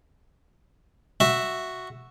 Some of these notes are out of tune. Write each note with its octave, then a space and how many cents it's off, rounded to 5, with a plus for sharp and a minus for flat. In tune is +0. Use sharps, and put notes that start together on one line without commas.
F#4 +0 E5 +0